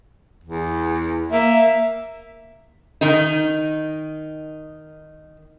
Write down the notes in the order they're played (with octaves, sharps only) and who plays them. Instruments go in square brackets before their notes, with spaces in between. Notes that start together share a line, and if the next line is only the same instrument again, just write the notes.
[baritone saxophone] E2
[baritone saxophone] A#3 [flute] E5
[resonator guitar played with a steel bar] D#3 D#4